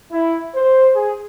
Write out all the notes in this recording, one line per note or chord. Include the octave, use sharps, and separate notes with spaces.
E4
C5
G#4